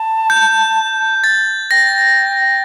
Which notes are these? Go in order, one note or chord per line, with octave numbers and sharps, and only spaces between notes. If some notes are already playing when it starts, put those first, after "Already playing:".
Already playing: A5
G6
A6
G5 A#6